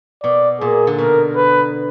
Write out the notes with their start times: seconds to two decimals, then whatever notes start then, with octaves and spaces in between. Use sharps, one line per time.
0.23 B2 D5
0.61 A#2 G#4
0.87 D3
0.98 B2 A#4
1.36 B4